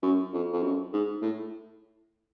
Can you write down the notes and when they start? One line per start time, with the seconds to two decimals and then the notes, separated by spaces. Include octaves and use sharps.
0.03 F#2
0.33 F2
0.53 F2
0.63 F#2
0.93 G#2
1.22 A2